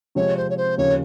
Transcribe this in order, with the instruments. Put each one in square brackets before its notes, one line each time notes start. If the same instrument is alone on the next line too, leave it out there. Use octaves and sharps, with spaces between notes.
[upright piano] C3 F3 G#3 C4 [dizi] C#5
[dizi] C5
C#5
C5
[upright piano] D#2 C#3 F3 A#3 C#4 [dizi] C#5